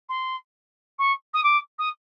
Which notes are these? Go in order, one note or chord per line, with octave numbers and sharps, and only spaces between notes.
C6
C#6
D#6
D6
D#6